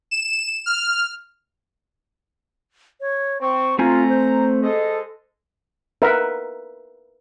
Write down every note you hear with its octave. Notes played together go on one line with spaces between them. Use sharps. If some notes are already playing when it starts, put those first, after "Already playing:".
E7
F6
C#5
C4 C#6
A3 C4 F4 G#5 A#5
C5
G#3 A4 C5 D#5
A#4 B4 E5 F#5